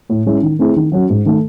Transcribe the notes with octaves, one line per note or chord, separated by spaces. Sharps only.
A2
G#3 C#4 E4
D#3
A3 C4 E4 G#4
D#3
F#3 C#4 F#4
G#2
D#3 A3